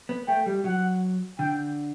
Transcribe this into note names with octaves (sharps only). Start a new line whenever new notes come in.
B3
A3 G5
G3
F#3 F#5
D3 G5